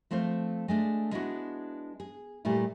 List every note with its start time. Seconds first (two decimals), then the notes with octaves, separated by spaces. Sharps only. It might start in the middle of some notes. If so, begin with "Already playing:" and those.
0.11 F3 A3 C4 F4 C5
0.68 G#3 A3 D4
1.12 G#3 B3 D4 E4 F#4
2.00 G#4
2.45 A#2 G3 A3 E4